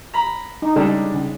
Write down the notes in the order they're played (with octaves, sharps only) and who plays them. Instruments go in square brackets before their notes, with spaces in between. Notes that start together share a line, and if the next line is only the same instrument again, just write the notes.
[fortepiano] A#5 B5
[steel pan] D#4
[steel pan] C#3 A4 [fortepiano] G3 G#3 D4
[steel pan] C#3